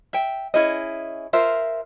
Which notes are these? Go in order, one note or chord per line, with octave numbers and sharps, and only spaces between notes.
E5 G5
C#4 E4 G#4 D#5
F4 A#4 C5 E5